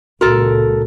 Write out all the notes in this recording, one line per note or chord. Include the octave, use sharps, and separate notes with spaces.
C#2 A#2 F#4 A4 A#4